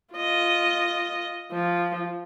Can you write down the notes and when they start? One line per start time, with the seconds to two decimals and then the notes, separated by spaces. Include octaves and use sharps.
0.14 F4 D#5
1.52 F3